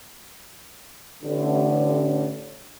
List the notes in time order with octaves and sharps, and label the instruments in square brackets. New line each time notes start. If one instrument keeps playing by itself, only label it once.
[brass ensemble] A1 A2 D3